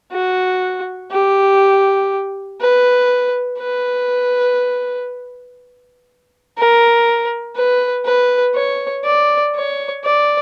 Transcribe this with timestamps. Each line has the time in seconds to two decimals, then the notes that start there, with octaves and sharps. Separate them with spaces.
0.12 F#4
1.11 G4
2.60 B4
3.59 B4
6.57 A#4
7.56 B4
8.05 B4
8.55 C#5
9.05 D5
9.55 C#5
10.04 D5